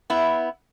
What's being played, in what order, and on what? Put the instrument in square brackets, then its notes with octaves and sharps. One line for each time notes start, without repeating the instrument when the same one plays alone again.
[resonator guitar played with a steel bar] B3 E4